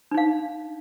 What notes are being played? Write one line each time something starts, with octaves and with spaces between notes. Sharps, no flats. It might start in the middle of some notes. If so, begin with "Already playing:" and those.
D4 D#4 F5